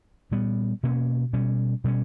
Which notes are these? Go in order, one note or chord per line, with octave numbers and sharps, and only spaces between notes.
A#2 G3 B3
B2 A#3 C#4
B2 G3 C#4
B2 G3 C#4